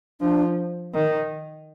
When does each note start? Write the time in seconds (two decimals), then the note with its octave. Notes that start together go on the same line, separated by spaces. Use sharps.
0.21 F3 D4
0.94 D#3